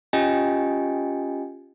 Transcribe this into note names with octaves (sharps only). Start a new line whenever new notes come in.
C#4 F4 G4 D#5 G5 G#5